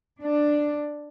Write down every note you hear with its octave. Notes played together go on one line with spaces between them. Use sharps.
D4